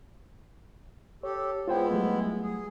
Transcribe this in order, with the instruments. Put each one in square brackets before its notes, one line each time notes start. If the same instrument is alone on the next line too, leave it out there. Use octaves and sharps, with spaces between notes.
[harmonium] G4 A4 [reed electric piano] C#5
[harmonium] G#3 B3 E4 [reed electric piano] F4 C5 G5
[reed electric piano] F#3 G3 A3
[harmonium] G#4